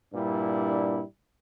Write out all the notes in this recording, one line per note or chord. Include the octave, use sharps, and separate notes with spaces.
G2 A#2 G3 D4 E4